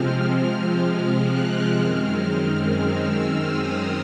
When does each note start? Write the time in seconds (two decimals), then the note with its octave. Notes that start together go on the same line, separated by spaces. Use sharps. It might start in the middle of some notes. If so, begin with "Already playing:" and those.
Already playing: C3 F3 G#3 C4 F6
1.16 F#6
1.71 F#2 D#3 G#3 C4 F6
2.83 E6
3.38 D#6